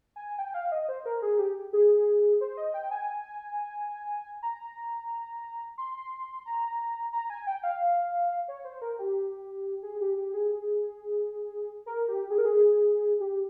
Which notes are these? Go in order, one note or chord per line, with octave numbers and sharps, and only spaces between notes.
G#5
G5
F5
D#5
C5
A#4
G#4
G4
G#4
C5
D#5
G5
G#5
A#5
C6
A#5
A#5
G#5
G5
F5
C#5
C5
A#4
G4
G#4
G4
G4
G#4
A#4
G4
G#4
A#4
G#4
G4